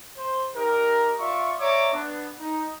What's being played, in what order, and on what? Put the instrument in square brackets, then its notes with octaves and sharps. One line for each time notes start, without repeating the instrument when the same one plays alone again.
[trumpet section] C5
D#4 G4 A#4
F4 D5 E5 C#6
C#5 D5 E5 A#5 D6
B3 D4
D#4